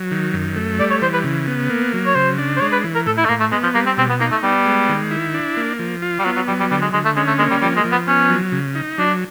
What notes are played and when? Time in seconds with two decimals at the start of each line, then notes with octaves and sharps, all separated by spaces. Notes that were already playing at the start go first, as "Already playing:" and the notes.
Already playing: F#3
0.11 D#3
0.34 F#2
0.56 A3
0.79 G3 D5
0.90 C#5
1.02 E3 C5
1.13 B4
1.24 C#3
1.47 B3
1.69 A#3
1.93 F#3
2.06 C#5
2.15 C#3 C5
2.38 D4
2.56 C5
2.61 G#3 C#5
2.72 B4
2.84 E3
2.95 A#4
3.06 A2 A4
3.17 E4
3.25 A3
3.29 A2 A#3
3.40 A3
3.52 G#3 B3
3.63 F3
3.75 G3 A#3
3.86 C4
3.97 B2 C4
4.09 B3
4.20 A#3 D#4
4.31 A3
4.43 G3 B3
4.66 G#3
4.89 D#3
5.11 E4
5.34 D4
5.57 A#3
5.79 F3
6.02 F4
6.19 G3
6.25 F#3 B3
6.36 F#3
6.48 F#3 G3
6.60 G3
6.71 D3 G3
6.82 G#3
6.93 D3 G#3
7.05 A3
7.16 G#3 C#4
7.27 A3
7.38 G#3 A#3
7.51 G3
7.62 F3 G3
7.77 G#3
7.84 F3
7.92 B3
8.07 B3 C#4
8.30 F#3
8.52 C#3
8.75 D#4
8.98 F#3 D4